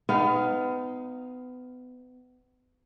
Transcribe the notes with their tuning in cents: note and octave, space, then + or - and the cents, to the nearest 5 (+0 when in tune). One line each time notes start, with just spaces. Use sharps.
B3 +30 D#4 +0 F5 +0